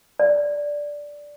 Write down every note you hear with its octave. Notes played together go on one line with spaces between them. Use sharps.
D5